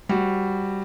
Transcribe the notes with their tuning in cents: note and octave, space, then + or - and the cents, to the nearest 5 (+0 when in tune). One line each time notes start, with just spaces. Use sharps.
G3 +0 F#4 +0 C5 +15